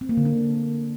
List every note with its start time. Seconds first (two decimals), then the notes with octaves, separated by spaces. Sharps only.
0.01 C4
0.09 A#3
0.17 D3
0.25 D4